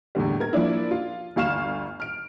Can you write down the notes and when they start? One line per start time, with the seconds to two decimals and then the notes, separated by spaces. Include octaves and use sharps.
0.15 E2 A2 D3 G3
0.40 A#4 G#6
0.53 F3 A#3 D4 E4
0.91 F4
1.36 G1 D2 F5 C#6 F6 E7
2.00 F6 D7